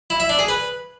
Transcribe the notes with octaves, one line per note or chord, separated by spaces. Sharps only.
E4
E5
D4
G#4
B4